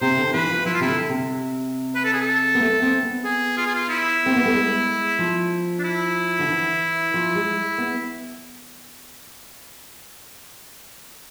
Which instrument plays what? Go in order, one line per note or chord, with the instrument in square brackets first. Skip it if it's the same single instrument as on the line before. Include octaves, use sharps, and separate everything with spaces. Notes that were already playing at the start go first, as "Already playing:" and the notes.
[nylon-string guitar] C3 [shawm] C5
[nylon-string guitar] D3
[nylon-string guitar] E3 [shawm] B4
[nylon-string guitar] F3
[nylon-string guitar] F3 [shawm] E4
[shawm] F4
[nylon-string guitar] C3 [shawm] E4
[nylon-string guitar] D3
C3
[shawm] B4
A4
G#4
A4
[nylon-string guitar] B3
A3
C4
B3
[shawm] G#4
F4
G#4
F4
E4
[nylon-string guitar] C4
B3
A3
G#3
F3
[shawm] D4
E4
[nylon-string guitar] D3
E3
F3
G#3
B3